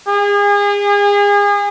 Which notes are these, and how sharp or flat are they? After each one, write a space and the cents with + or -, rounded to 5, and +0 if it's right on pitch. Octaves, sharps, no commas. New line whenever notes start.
G#4 -35